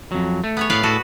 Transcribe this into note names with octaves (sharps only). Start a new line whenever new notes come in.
F2 F#3
A3
B3 G#4 C#5
A2 B4 D5 F5
A2 F#4 A4